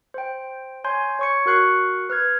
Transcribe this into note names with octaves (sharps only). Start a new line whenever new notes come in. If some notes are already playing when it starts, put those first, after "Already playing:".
C5 G5
C#5 G#5 C6 G6
C#5 C#6 C#7
F#4 A#4 C#6 F#6 C7 C#7
B4 F6 G#6